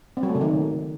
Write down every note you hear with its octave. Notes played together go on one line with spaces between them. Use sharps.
C4
F#3
A3
C#3
D#3